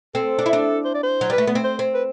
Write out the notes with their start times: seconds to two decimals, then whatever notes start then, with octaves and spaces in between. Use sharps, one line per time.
0.15 C4 A4
0.39 D4
0.46 E4
0.53 D4
0.85 C5
0.94 D5
1.03 C5
1.21 F#3
1.30 G3 B4
1.38 A3
1.47 B3
1.55 C4
1.64 C5
1.79 C4
1.94 B4